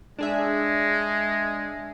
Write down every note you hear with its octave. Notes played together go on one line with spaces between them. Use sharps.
G#3 D4 G#4 E5